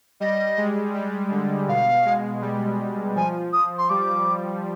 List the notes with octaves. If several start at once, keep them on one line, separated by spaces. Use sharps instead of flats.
G3 D#5
G#3
G3
D3
B2 F5
G#3
G3
F3 G#5
D#6
C6
G3 D6